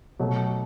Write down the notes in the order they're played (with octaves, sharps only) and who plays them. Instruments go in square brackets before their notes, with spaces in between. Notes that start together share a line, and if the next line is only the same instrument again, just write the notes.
[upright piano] B2 F#3 A3